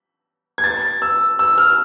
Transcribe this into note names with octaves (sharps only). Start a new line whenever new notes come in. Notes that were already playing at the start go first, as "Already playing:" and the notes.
G#6
A6
E6
E6
F6